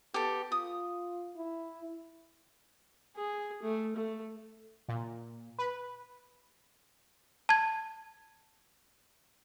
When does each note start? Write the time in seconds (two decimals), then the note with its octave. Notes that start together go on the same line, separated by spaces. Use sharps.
0.14 B3 G4 A4
0.52 F4 D#6
1.37 E4
3.16 G#4
3.63 A3
3.96 A3
4.88 A#2
5.58 B4
7.49 A5 G#6